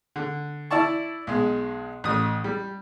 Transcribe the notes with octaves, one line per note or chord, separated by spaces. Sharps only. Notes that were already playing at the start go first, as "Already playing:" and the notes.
D3
E4 D5 A5 C#6
B1 G#3
A1 D#6
G3